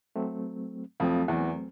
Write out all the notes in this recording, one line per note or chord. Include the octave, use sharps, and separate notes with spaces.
F#3 A3 C4
F2 F3 F#3 A3 C4
E2 E3